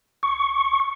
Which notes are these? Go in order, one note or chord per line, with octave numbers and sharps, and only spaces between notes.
C#6